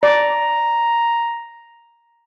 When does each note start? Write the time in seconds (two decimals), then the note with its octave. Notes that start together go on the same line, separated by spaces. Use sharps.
0.03 D5 A#5